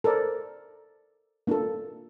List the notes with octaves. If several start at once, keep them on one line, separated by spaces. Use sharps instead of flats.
A4 A#4 C5 D5
A#3 D4 E4 F4 A4